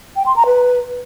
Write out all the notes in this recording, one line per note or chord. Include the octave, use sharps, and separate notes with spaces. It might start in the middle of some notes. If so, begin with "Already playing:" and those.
G5
C6
A#5
B4